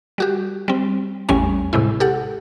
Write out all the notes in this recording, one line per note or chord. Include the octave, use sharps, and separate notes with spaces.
G3 F#4 G4
G3 C4
A1 E2 G3 A3 C#4 G#5
A2 C3 G#3 E4
G4 A4 F#5